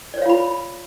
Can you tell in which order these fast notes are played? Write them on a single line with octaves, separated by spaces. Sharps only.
D5 C#5 F5 F4 B5